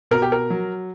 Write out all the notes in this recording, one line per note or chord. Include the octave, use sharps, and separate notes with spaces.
B2 A#4
G4
A#4
F#3